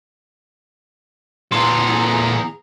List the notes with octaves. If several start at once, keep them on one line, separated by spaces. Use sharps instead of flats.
A#2 E3 B3 G#4 A4 A#5 C6